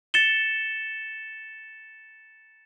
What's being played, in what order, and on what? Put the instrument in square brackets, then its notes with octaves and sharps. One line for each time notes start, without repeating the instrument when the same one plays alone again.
[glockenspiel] A6 C#7 E7 G7